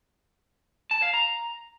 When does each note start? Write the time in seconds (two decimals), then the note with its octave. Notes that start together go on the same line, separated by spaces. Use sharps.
0.91 A5
1.02 F5
1.14 A#5